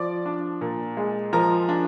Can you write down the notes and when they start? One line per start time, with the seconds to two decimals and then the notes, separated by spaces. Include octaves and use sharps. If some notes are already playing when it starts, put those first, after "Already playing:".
Already playing: F3 D5 D6
0.26 D4
0.61 A#2
0.97 G#3
1.33 F3 A#4 A#5
1.69 D4